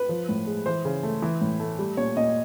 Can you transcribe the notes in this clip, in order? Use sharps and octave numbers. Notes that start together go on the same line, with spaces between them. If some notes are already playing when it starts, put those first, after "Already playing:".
Already playing: B4
F3
A2
G#3
E3 C5
C#3
A3
E3
A2
A3
G3
A#2 C#5
A#2 D#5